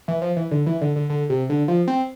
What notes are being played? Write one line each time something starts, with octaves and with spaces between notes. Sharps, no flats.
E3
F3
E3
D3
E3
D3
D3
D3
C3
D3
F3
C4